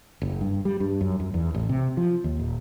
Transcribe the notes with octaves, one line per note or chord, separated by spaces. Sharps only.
F#1
G2
G3
G2
F#2
F#2
E2
A1
C3
F3
D#2
D#1